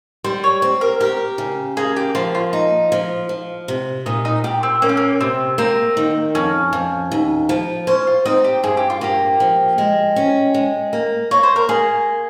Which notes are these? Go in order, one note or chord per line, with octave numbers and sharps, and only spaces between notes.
G3 C5
C#5
C4
A#4
G4 A#4
C#3
A#3 G#4
G4
F3 F4
F4
D#4
F3
F3
C3
A#2 D#4
D#4
A#2 G4
C4
A#3 C#4
C4
A#3
C3 C4
A#3 C4
D#3
F2 C#4
F2
D#2
F3
C#4 C5
F4
C4 D#4
G4
G2 G#4
G4
F4
A#3 G4
F3
G#3
C#4
G#3
A#3
A#3 C#5
C5
A#4
A#3 G#4